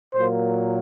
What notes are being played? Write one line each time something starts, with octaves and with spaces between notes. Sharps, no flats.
A#2 F#3 A#3 C5